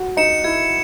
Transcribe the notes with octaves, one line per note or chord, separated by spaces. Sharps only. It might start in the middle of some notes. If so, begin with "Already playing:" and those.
Already playing: F#4
D#4 C#7 E7
E4 G#6